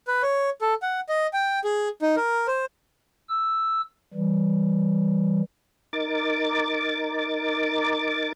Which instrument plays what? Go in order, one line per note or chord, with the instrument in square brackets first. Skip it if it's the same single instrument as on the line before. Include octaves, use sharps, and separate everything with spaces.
[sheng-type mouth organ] B4
C#5
A4
F#5
D#5
G5
G#4
D#4
A#4
C5
[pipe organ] E6
E3 G3
[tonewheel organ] D#4 A#4 D6 A6